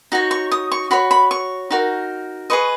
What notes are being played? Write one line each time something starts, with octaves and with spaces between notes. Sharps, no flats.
D#4 F#4 C#5
C#6
D#6
C#6
F#4 C#5 B5
B5
C#6
D#4 F#4 A#4
G#4 B4 D#5 C#6